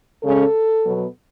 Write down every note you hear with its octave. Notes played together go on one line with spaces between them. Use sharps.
C#3 G#3 C#4 A4
B2 F#3 B3